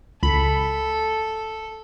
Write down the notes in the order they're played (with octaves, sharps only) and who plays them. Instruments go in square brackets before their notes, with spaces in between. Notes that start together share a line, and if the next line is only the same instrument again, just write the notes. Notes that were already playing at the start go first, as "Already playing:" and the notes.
[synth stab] C#2 B5 [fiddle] A4